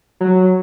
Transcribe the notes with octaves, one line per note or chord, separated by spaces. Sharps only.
F#3